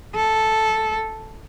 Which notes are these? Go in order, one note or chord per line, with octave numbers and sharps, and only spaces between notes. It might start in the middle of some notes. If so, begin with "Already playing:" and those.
A4